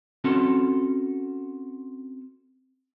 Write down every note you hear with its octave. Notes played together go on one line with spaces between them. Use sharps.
C4 C#4 F#4 A4